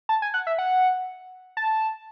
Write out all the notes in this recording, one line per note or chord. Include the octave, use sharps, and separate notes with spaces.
A5
G#5
F#5
E5
F#5
A5